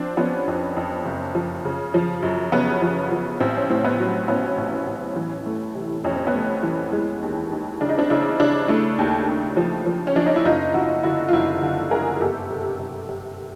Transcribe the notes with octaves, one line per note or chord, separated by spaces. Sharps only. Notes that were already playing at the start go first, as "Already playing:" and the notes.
Already playing: F3 C4 D4
F3 B3 C#4
F2
F2
F#1
F3
C#3
F3
F#2
C#3 B3 C#4
F3
F3
A1 C4
C#4
A2 C4
B3
F#3
A1 B3 C#4
A1
A1
E3
A3
C3
F2 C#4
C4
B3 C#4
A3
E3
G#3
D#2
D#2
C#3 D4
D#4
C4 D4
C#3 D4 E4
C#3 D4 E4
A3 D4 E4
D#2
D#2
F3
F3
C#4
F3 D4
D#4
E4
F#1 D#4 F4
F#1 E4 F#4
D3 E4 F#4
F4
F#1 E4 F#4
D3
F#1 G#4 A#4
G1 G4 A4
C3
C3
C3